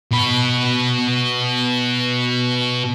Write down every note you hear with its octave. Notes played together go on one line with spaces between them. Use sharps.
B2 B5